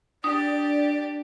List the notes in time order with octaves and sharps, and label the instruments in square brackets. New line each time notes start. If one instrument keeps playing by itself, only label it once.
[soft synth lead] D4 [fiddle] G4 [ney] D5 [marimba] D#6